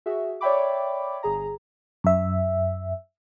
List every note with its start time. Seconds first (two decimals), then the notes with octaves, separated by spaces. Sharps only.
0.06 F#4 G#4 E5
0.41 C#5 D5 E5 G5 B5 D6
1.23 G1 G#4 A#5
2.04 F#2 E5